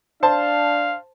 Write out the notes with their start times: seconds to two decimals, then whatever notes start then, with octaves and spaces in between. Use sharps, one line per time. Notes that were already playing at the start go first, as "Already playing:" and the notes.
0.23 D4 C5 F5 A5